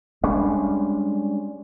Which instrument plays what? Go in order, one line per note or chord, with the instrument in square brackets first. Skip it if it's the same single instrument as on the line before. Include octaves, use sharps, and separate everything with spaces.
[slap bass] G3 G#3 C#4 D4